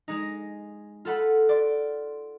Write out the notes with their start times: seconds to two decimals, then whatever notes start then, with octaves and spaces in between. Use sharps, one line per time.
0.08 G#3 D#4
1.05 F4 A4 F#5 B5
1.49 D5 C6